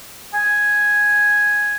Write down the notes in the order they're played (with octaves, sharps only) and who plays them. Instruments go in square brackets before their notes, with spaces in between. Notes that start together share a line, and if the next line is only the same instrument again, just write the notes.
[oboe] G#5